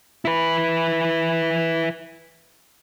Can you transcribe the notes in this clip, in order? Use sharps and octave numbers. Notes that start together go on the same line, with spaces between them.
E4 B4